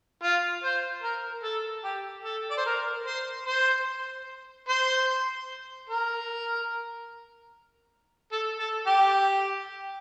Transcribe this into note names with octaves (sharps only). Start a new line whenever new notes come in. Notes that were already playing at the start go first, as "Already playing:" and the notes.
F4
C5
A#4
A4
G4
A4
D5
C5
A#4
C5
C5
C5
A#4
A4
A4
G4